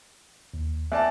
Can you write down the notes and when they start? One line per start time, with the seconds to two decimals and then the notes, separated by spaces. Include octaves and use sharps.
0.54 D#2
0.92 E2 D5 E5 A5